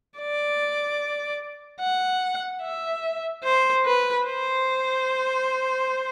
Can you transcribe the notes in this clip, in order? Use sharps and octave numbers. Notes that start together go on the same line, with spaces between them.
D5
F#5
E5
C5
B4
C5